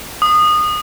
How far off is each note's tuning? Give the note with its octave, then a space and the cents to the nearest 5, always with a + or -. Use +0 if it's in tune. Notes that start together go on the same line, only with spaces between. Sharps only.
D#6 -25